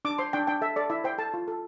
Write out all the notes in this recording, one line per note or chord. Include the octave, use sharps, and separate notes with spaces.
D4 D6
C5 C6
D4 G5
D4 G5
A4 E5
A4 D5
E4 E5
C5 G5
A4 A5
F4
A4